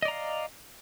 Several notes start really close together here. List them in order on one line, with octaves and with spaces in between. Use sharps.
D#5 D5 A#5 F5